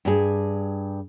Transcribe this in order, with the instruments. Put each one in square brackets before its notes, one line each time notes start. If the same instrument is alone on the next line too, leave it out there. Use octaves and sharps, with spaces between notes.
[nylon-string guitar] G2 G#4